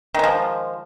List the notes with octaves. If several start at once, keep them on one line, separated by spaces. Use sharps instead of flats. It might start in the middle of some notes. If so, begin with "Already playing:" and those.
D#3 F3 G#3